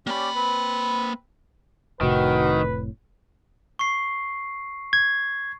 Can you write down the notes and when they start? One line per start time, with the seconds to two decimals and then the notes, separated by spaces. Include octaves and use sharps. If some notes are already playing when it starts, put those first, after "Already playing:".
0.07 A#3 C#4 G4 D5 B5
0.36 C4 B4
2.01 F1 A2 C3 D#3 F#4 B4
3.79 C#6 C7
4.93 G#6